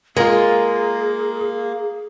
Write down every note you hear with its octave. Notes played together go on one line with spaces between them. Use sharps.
G#3 A#3 F4 G#4 A#4